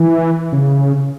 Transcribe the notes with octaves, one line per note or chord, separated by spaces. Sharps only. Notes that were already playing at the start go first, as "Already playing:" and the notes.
Already playing: E3
C#3